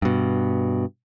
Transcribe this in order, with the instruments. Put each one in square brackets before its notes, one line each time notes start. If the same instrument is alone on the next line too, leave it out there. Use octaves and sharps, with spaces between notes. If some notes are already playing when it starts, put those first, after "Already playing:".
[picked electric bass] G2 B2